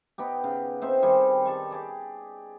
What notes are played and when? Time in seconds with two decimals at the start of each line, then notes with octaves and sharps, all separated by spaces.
0.18 B3 D#4 G4
0.44 C#3
0.82 C4 D#4 C5 E5
1.02 D#3 G3 C4 G#4
1.45 G3 A5 C#6
1.71 G4 G#4 D5